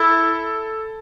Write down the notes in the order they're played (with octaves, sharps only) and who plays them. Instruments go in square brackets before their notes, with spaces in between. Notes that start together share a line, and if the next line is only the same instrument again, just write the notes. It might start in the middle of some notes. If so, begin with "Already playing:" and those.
Already playing: [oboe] E4 [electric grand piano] A4